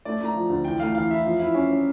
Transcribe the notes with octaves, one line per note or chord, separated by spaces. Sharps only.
A3 D5
A3 A#5
F3
D2
E3 G5
A3 F5
E3 F5
E4 E5
F3
E4
C#4
C#4